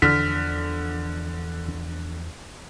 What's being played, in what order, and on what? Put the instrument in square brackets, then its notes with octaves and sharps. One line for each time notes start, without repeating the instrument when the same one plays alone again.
[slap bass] E2 E3 F3 [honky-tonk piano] D3 [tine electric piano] F6 B6